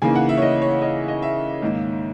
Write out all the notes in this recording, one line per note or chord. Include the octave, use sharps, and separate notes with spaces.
C#3 E3 A#3 D#4 G#5
F#5
E5
C#5
D#5
C#5
D#5
D#5
E5
G#2 D#3 A#3